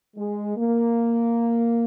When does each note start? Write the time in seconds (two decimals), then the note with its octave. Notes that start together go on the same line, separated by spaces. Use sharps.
0.17 G#3
0.57 A#3